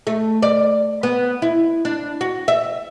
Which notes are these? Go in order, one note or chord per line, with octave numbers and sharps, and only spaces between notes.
A3
D5
B3
E4
D4
F#4
E5